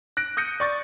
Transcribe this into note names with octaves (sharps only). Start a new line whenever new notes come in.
F#6 A#6 D7
D#6 G6 A#6 C#7 D#7
D5 C#6 A6